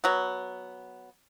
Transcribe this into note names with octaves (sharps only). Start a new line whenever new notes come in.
F#3 B3